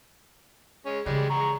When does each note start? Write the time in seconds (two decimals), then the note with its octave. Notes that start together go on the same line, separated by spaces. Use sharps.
0.86 G#3 C#4
1.06 C#3 E3 G3 G#3
1.30 G#3 A#5 C#6